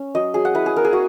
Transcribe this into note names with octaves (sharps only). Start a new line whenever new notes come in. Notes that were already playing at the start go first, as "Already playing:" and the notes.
Already playing: C#4
F#3 D#5
F#3 G#4
F#5
E4 B4
G#4
B3 A#4
G#4
F#4